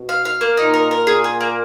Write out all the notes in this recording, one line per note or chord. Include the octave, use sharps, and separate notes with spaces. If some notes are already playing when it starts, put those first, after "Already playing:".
Already playing: B2
F5
F5
A#3
A#2 D#4
A#4
A#4
A#2 G#4
G#4
A#3